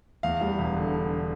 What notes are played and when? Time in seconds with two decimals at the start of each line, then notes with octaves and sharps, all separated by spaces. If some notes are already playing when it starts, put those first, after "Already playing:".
0.23 E2 F5
0.41 G3
0.59 E1
0.77 D3